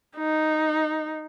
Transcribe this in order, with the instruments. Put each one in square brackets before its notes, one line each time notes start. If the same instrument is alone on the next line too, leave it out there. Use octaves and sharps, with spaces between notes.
[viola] D#4